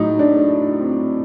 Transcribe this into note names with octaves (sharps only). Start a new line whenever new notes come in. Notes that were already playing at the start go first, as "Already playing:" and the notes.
Already playing: A2 F#3 D#4
D4
C4